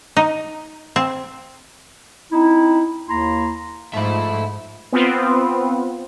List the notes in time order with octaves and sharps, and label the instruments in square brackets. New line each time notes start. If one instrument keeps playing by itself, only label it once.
[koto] D#4
C4
[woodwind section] C4 D#4 E4
D#2 A#3 E4 A#5 C6
[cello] G#2 [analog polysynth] F3 A3 [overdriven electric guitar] E5 B5
[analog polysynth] B3 C4 F4 B4